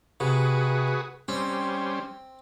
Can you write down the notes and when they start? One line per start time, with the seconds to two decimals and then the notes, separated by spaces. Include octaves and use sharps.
0.20 C3 F#4 G#4 B4
1.28 G3 C4 C#4 C5